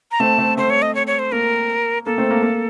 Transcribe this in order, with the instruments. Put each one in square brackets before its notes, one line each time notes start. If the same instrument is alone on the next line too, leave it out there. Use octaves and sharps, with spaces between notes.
[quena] A#5
[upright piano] A3 C4 [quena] A5
[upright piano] A3 C4
[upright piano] A3 C4 [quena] C5
[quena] C#5
D#5
C#5
C#5
C5
[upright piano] A#3 [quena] A#4
[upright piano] A#3 [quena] A4
[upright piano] A3 C4
A#3
A#3